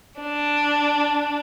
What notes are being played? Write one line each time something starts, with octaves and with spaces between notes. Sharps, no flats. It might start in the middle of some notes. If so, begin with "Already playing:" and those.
D4